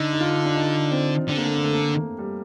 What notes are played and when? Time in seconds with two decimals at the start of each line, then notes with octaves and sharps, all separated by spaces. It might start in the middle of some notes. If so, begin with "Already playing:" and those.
Already playing: D3 D#4
0.13 D#4
0.21 F4
0.45 D4
0.56 D#4
0.91 C4
1.28 D3 C4
1.37 A#3
1.46 A3
1.55 A#3
1.64 A3
1.73 A#3
1.82 A3
2.00 A3
2.19 G3